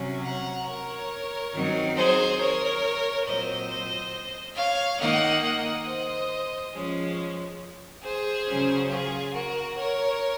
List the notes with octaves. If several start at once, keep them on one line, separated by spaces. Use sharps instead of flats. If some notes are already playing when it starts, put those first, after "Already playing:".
Already playing: C3 F#3 C#4
F#5 A#5
A#4 C#5
D#3 F#3 C4 D#4
G#4 C5
A#4 C#5
A#2 F#3 C4 C5 D#5
C#5 F5
D#3 A#3 D#4 D#5 F#5
D#5 F#5
C5 D#5
F3 G#3 C#4
G#4 C5
C#3 F#3 C#4
F4 G#4
F#4 A#4
A#4 C#5